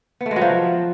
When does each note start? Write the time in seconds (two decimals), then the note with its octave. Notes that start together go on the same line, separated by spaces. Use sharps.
0.21 B3
0.26 A3
0.31 G#3
0.36 F#3
0.41 F3